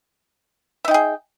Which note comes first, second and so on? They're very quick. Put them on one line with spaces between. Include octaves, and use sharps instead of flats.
E5 D#4 G5 G#4